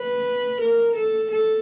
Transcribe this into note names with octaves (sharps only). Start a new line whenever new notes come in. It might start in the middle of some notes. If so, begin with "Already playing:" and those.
Already playing: B4
A#4
A4
A4